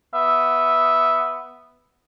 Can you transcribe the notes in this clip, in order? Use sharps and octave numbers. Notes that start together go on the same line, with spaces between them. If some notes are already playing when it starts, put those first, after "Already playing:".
B3 E5